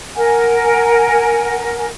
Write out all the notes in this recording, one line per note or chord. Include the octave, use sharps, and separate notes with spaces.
A#4 F#5 G#5